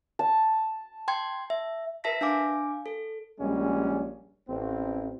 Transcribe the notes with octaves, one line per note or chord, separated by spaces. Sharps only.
A5
G5 C6 G#6
E5
A#4 B4 E5 A5 A#6 B6
D4 F5 G#5 D6
A4
A#1 G3 G#3 C#4
A1 C4